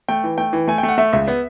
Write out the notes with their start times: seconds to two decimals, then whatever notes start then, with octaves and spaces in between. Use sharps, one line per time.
0.09 A3 G5
0.24 E3
0.38 A3 G5
0.53 E3
0.68 A3 G#5
0.78 G5
0.83 A3
0.89 F#5
0.98 A3 E5
1.13 C#2 E5
1.28 B3